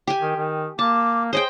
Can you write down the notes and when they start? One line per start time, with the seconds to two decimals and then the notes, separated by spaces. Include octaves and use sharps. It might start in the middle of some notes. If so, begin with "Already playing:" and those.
0.07 G4 G#5
0.22 D#3
0.36 D#3
0.79 A#3 A5 D6
1.33 G#4 C5 C#5 D#5 G5